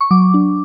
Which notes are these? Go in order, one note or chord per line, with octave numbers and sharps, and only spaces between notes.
C#6
F#3 D6
D4